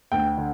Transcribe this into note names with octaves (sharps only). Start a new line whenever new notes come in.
D2 G5
D3